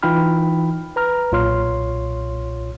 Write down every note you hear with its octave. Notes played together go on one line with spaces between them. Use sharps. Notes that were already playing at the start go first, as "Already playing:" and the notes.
E3 D#4 F4 G5 B5 F6
B4 A#5 F6
B1 A#2 F4 C#5 C6 F6